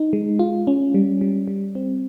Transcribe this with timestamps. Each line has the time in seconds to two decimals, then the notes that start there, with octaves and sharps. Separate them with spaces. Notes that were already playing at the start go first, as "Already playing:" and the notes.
Already playing: D#4
0.13 G#3
0.39 F4
0.67 C#4
0.94 G3
1.21 G3
1.48 G3
1.75 C4